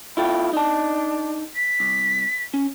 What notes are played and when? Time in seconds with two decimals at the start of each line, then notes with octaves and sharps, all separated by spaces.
0.17 E4 F4 A4 G5
0.53 D4 D#4 A5
1.56 B6
1.80 C2
2.54 C#4